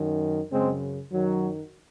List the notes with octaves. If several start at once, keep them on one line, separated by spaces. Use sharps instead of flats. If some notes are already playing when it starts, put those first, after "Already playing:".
Already playing: F#2 D#3
F#2 C#3 G#3 C4
F#2 D#3 F#3